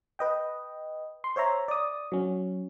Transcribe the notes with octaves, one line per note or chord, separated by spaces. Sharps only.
B4 D#5 G5
C6
C5 C#5 E5 A#5
D5 D#6
F#3 C#4